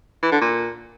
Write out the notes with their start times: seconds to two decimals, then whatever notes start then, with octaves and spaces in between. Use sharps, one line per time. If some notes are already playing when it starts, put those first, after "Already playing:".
0.23 E3
0.32 D3
0.41 A#2